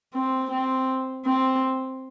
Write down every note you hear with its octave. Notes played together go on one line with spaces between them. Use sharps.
C4
C4
C4